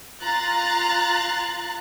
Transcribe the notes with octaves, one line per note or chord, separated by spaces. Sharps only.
F4 A#5 F#6 A6